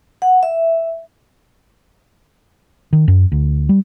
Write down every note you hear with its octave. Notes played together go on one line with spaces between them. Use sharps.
F#5
E5
D#3
F#2
D2
G3